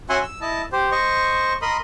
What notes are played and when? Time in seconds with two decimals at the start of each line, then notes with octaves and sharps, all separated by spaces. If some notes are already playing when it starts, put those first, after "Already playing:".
0.09 C#4 F#4 E5 F#5 G#5 C6
0.23 E6
0.41 E4 D#5 A5
0.72 G4 C5
0.92 C5 D#5 C#6
1.62 A#4 D#5 B5 C6 D#6